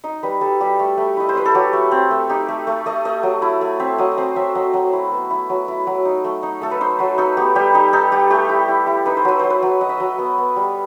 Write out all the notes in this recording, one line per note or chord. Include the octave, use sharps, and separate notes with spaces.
D#4 D#5
G3 B4
G3 A4
G3 G4
A3
A3
E4 D#5
C5
E4 B4
A4
F#3 G4
A3
C4
A3
D#4 G4
A3
A3
A3 D#5
A3 D#5
F#3
E4
A3
C4 E5
F#3 D#5
D#5
C4 C5
F#3 E5
F#3 D#5
F#3
E4
B3
E4
F#3
E4
F#3
D#4
A3
D#4
A3 A4
B4
D#4 C5
F#3 B4
D#4 A4
B3 G4
G3 G4
D#4 G4
D#4 A4
G3 G4
A3 G4
E4
E4
E4
D#4 B4
C5
F#3 B4
F#3 C5
B4
F#3
F#3 D#5
E5
F#3 D#5
B3
B3
G3